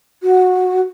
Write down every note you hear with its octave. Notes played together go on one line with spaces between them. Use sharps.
F#4